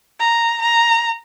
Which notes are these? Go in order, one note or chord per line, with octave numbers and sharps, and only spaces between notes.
A#5
A#5